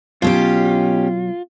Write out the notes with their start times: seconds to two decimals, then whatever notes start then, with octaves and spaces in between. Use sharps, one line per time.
0.22 B1 B2 F#3 C#4 F4 G4